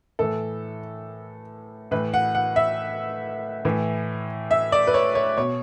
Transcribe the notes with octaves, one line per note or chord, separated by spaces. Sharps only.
A2 E3 A4
A2 E3 B4
F#5
F#5
E5
A2 E3
E5
D5
B4
C#5
C#5
B2 C#5